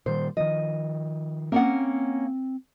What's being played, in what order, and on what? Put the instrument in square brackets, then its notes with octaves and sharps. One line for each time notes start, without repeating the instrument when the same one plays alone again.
[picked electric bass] A#2 D#3 G3 [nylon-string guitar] C5
[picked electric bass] D#3 F3 [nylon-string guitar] D#5
[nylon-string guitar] A#3 C#4 F#5 [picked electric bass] C4